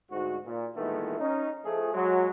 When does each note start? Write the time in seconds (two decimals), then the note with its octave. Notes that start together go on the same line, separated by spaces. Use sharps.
0.10 D2 G#2 F#4
0.44 A#2
0.76 A#2 D#3 E3 G#3 A3 B3
1.20 C#4 D#4
1.64 F3 A3 G#4
1.93 F#3 G#3